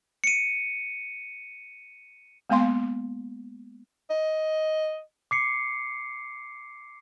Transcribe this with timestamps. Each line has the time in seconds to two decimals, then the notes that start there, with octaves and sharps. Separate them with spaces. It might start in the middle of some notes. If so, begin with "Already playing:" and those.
0.24 C#7 D#7
2.49 G#3 A#3 B3 F5 C6
4.10 D#5
5.31 D6 C7 C#7